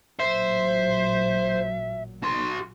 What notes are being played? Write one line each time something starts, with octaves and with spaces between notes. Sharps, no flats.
A1 A#2 F#3 C5 E5
F#4 C6